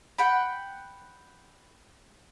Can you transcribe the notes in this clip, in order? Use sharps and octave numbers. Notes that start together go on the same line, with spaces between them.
F#5 G5 B5